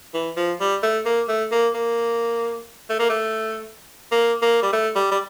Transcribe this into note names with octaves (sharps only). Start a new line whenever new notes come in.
E3
F3
G3
A3
A#3
A3
A#3
A#3
A3
A#3
A3
A#3
A#3
G3
A3
G3
G3